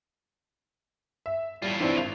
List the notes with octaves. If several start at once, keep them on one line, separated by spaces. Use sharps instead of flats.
E5
A2 G3 F4
E3 C4 D4
G#1 F7